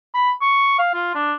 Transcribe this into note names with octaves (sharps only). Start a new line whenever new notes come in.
B5
C#6
F5
F4
D4